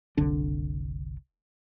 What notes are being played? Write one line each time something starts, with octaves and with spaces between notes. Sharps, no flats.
F#1 C2 D3 D4